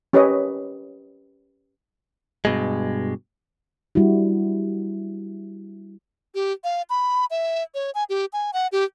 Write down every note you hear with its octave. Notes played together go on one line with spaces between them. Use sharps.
C#4 G4 A#4 B4 C#5 D#5
G2 B2 G#3
G3 D4 E4 F#4
G4
F5
B5
E5
C#5
G#5
G4
G#5
F#5
G4